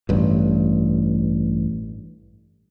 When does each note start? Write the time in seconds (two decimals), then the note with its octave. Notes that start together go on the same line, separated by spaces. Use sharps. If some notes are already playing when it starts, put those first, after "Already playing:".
0.09 A1 G2